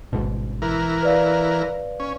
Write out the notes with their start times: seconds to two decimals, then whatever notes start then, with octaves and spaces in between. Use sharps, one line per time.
0.13 G#1 G#2 B2
0.62 E3 A#4
1.02 B4 D5 F5
2.00 C#4